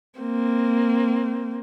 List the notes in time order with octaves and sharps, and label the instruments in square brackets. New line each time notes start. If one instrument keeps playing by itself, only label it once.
[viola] A#3 C4